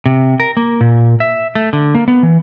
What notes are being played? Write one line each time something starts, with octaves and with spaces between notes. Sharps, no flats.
C3
A#4
A#3
A#2
E5
A3
D3
A#3
B3
E3